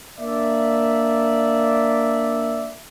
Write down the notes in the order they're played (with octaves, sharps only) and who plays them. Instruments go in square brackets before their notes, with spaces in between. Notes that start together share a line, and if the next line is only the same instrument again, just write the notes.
[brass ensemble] A#3 D4 D5 E5